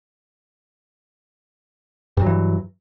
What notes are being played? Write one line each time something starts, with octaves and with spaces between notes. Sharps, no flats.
G2 E3 F#3